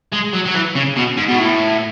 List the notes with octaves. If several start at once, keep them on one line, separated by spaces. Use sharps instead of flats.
G#3
F#3
F#3
E3
C#3
B2
G#2
B2
A2